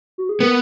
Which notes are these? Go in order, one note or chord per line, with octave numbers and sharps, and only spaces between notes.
F#4
G#4
B3 A#4